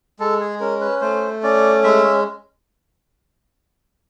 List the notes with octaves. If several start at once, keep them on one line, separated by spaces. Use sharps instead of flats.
G#3 A4
G#4
C#4 A#4
B4
A3 C5
C#4 D5
G#3 E5